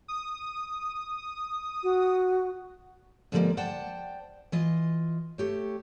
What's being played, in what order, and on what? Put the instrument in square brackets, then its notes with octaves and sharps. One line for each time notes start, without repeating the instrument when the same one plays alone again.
[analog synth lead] D#6
[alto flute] F#4
[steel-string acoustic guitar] A2 D3 F3 G3 G#3 A#3
C5 D5 F#5 G5 A5
E3 F4 D#5
A3 G4 C#5